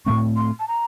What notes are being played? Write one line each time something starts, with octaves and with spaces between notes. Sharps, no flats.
A2 A3 C4 C#6
C6
A5
A#5